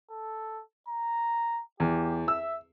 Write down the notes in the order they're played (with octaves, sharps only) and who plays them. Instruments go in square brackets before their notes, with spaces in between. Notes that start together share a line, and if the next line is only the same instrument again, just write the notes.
[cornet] A4
A#5
[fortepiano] E2 [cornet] G4
[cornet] E5 [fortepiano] E6